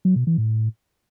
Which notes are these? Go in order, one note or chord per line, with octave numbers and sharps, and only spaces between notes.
F#3
B2
E3
A2